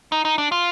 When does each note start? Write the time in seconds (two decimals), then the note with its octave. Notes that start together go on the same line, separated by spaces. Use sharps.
0.12 D#4
0.25 D#4
0.38 D4
0.52 F4